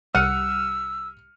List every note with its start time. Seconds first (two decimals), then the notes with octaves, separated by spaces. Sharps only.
0.15 C2 G3 F#5 E6 F6 C#7 D#7